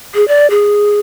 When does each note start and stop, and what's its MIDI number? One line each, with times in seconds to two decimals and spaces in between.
0.14 0.27 68
0.28 0.49 74
0.50 1.00 68